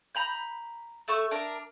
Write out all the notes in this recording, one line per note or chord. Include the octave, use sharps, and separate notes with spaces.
A#5 B5 G6
A3 A4 C#6 E6
D4 A#4